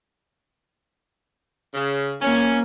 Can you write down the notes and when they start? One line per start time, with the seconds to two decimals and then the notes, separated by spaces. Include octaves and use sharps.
1.74 C#3
2.22 A#3 C#4